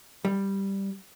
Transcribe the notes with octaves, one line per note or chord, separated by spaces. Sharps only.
G3